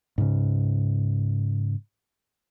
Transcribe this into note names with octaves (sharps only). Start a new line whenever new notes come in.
G#2 C#3